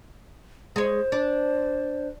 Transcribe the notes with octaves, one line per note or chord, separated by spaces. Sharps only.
G#3 C5 C#5
D4